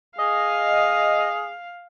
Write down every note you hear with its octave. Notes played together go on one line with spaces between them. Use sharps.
G#4 D#5 F5